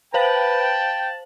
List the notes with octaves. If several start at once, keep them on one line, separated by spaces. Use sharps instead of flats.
B4 C5 F5 G5 A5 F#7